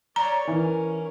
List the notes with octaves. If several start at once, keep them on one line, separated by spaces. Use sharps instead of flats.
C#5 D5 A#5
E3 C#4 A#4